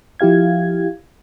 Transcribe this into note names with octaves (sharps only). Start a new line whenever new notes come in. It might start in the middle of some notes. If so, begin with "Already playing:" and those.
F3 E4 G4 F5 G#6